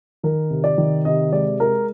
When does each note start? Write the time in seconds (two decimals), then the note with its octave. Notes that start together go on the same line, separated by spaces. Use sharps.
0.23 D#3 A#4
0.50 C3
0.64 D5
0.78 D#3
1.05 C3 D#5
1.32 G#3 D5
1.60 G#3 A#4